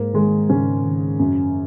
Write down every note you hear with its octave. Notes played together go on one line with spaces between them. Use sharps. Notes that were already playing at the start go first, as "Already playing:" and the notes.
Already playing: G#2 A#3
D#3 G#3
G#2 C#3 C#4
D#3
F#2